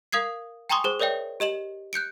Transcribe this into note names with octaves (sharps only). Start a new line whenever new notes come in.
A#4 F5 D#6 G#6 C7
G5 G#5 A#5 C6 C#6 D#6
G#4 C5 D6
A#4 C#5 D5 E5 G5
G4 D#5 E7 F#7
F#6 G6 C#7 D7